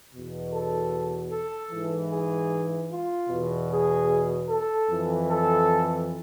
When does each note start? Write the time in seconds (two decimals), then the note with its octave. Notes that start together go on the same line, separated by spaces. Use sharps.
0.13 E2 B2
0.52 A4
1.32 A4
1.71 G#2 E3
2.11 G#4
2.90 F4
3.30 E2 B2
3.70 G#4
4.49 A4
4.88 F2 E3
5.27 A4